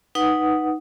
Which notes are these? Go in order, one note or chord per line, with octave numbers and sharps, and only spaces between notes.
D#4 B4 F#5 D#6